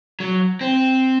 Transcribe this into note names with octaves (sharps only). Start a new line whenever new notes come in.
F#3
C4